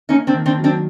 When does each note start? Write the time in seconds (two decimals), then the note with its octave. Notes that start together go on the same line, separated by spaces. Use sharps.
0.09 A#3 C#4 D#4
0.27 C4 D4
0.34 D#3
0.46 C4 D4
0.58 F#3
0.64 C4 D4